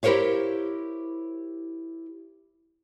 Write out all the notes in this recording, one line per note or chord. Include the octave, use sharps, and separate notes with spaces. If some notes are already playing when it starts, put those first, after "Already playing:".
E4 G4 A#4 C5 C#5 F5